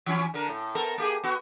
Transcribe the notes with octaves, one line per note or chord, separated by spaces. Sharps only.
E3 F#3 C#4
D3 A#4
A2
B3 A4 A#4
A#3 G4 G#4
B3 F#4